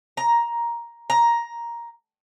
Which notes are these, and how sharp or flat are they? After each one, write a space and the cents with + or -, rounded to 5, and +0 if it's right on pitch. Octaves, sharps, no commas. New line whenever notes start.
A#5 +10
A#5 +10